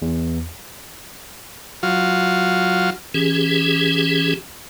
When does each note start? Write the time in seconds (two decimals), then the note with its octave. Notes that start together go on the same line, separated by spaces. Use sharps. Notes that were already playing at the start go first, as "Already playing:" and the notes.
0.02 E2
1.83 F#3 F4
3.14 E3 C#4 G4 G#4